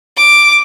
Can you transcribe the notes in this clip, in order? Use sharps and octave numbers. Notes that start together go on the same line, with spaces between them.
D6